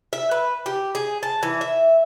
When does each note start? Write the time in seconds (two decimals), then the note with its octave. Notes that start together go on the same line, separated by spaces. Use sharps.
0.13 E5
0.31 B4
0.66 G4
0.95 G#4
1.23 A5
1.43 E3
1.61 E5